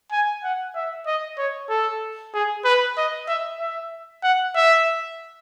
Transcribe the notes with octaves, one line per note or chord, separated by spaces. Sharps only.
G#5
F#5
E5
D#5
C#5
A4
G#4
B4
D#5
E5
E5
F#5
E5